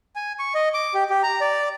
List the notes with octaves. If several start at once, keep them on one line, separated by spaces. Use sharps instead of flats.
G#5
C#6
D#5
D6
G4
G4
A#5
D5